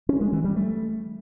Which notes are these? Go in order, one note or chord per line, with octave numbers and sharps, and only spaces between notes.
C#4
G#3
E3
G3
A3